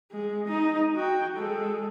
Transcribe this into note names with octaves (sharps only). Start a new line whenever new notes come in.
G#3
D#4 D#5
F#4 G5
G#3 A4